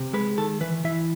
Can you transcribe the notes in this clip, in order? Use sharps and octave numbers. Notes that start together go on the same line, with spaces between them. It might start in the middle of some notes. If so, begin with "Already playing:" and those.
Already playing: C3
G#3 B4
D#3 A4
E3 B4
E3 E5